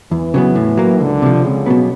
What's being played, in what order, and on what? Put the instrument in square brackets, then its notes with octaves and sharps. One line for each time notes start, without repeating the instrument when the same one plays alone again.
[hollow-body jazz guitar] E2 [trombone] E3
[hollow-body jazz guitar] C#3 F#3 B3
A2
F#3 A#3
[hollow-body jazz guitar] C#2 [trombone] D3
[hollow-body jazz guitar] C3 F3
[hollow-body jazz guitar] C#2 [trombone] C#3
[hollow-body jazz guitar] B2 F#3 B3